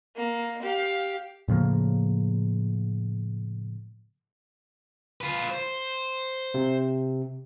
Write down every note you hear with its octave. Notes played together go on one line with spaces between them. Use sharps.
A#3
G4 F5
A2 C#3 F3 A#3
F4 B4
C5
C3